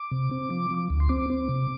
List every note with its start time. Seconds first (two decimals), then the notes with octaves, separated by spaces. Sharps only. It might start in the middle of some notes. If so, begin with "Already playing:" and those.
Already playing: D6
0.11 C3
0.31 C4
0.50 F3
0.70 F3
0.90 D2
1.00 C6
1.09 C4 D6
1.30 C4
1.49 C3